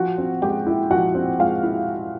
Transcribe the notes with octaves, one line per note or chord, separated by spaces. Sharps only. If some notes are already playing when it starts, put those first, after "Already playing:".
Already playing: F3 F#4 F#5
C4
G#3 G4 G5
E4
F3 F#4 F#5
C4
G#3 F4 F5
E4